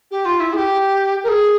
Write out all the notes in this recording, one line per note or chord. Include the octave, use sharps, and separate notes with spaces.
G4
F4
E4
G#4
G4
A#4
G#4